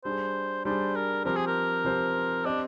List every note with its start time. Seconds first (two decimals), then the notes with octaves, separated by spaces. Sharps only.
0.04 G3 D4 G#4 C5
0.65 G3 D4 G#4 C5
0.95 A#4
1.25 F3 C4 G4 A#4 C5
1.36 G#4
1.47 A#4
1.85 F3 C4 G4 C5
2.45 C4 D4 G4 C5 D#5